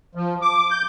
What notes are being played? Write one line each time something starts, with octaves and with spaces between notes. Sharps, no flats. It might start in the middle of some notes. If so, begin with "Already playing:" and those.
F3
D6
G6